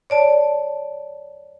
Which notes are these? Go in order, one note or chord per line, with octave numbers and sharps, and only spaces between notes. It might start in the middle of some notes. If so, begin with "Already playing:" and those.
C#5 D5 A5